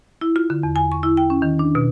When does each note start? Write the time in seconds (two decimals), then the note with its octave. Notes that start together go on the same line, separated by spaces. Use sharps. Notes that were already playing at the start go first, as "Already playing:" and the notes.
0.21 E4
0.36 F4
0.50 D3
0.63 E2
0.76 G#5
0.92 C#6
1.03 E4
1.17 G5
1.30 C#4
1.42 D#3
1.59 D4
1.75 B2